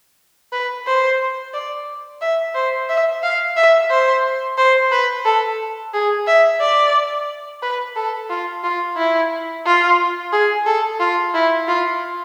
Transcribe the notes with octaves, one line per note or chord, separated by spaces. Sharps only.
B4
C5
D5
E5
C5
E5
F5
E5
C5
C5
B4
A4
G#4
E5
D5
B4
A4
F4
F4
E4
F4
G#4
A4
F4
E4
F4